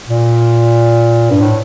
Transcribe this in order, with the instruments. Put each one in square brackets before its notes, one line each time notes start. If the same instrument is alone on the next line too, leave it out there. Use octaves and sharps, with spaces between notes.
[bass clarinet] A#2
G2
A2